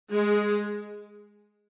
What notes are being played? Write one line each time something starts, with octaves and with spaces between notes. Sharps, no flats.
G#3